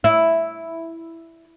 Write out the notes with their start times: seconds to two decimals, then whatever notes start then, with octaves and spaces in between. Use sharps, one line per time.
0.04 E4